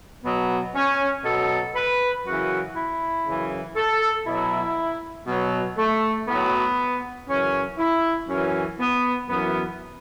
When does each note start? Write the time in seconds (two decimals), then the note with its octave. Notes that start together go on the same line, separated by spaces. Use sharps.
0.24 B2 F#3 B3
0.75 C#4
1.24 B2 F#3 A4
1.75 B4
2.25 F#2 C#3 E3 F#4
2.75 E4
3.27 F#2 C#3 E3
3.76 A4
4.26 B2 F#3 E4
5.27 B2 F#3
5.78 A3
6.28 A2 F#3 B3
7.28 F#2 C#3 E3 C#4
7.78 E4
8.29 F#2 E3 C#4
8.79 B3
9.29 F#2 E3 B3